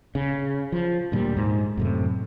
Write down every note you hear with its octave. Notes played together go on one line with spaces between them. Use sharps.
C#3
F3
D2 A#2 G3
G#2
F#2 A2 C3